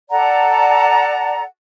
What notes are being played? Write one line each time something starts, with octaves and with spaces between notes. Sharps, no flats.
A4 D5 F#5 A#5